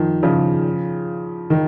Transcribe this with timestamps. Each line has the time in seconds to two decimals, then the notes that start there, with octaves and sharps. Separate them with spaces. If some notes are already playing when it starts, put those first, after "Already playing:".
Already playing: D#3 F3
0.23 C#3 F3
1.50 D#3